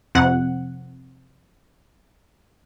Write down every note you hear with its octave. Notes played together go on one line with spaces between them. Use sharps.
F2 C3 F#5